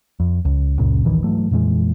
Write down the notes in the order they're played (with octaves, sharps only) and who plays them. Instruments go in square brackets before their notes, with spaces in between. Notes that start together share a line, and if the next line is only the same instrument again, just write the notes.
[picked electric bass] F2
C#2
C#2 F#2 A#2 C#3
A1 D2 D#3 E3
G#2 E3 F#3 A3
F2 A#2 E3 G#3